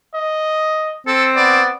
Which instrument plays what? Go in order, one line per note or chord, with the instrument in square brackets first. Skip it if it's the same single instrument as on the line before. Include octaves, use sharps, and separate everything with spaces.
[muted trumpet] D#5
[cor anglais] C4 [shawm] A4
[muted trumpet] B3 [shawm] D5